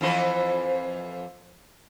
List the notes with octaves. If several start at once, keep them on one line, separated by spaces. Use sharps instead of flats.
F2 E3 C5